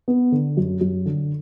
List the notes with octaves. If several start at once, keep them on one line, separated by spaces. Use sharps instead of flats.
B3
D3
F#2
F#2
D3